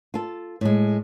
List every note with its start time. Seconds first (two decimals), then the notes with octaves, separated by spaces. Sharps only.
0.14 F4 A4
0.61 A2 G#3